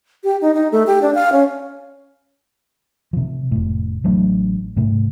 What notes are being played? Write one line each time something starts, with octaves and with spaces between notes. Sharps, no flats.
G4
D#4
D#4
A3
G4
D4
F5
C#4
C3 F3
F1 A2
A1 F#3 A3 D4
G#2 C3 A3